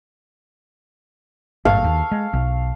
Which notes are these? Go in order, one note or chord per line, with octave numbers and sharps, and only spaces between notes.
G#1 G2 A#2 A4 F5 C#6
D#2
G#3
B1